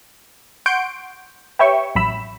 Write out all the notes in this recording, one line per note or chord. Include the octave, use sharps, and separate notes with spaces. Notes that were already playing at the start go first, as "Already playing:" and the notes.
F#5 C6 C#6 G6 D7
G4 B4 C#5 E5 G5 C#6
A1 F#3 B5 E6